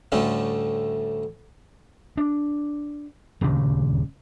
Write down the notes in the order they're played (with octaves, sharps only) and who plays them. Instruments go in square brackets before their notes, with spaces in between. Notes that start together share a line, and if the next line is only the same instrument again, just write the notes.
[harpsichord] D2 A2 D3 G3 A3 C#4
[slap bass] D4
D#1 D2 G2 C#3